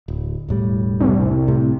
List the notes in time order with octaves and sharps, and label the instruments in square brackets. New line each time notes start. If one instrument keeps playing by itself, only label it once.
[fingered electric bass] D1
E1 A2 G3
[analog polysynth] C2
[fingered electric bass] A2 C3